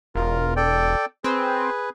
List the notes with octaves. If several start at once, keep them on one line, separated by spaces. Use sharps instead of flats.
E1 F4 A#4
A4 D5 G5
C4 G#4 B4